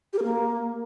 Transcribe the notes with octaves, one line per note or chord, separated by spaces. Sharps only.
G4
A#4
A#3